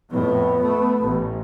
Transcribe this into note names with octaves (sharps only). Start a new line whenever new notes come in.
F2 A2 B3
A3
A1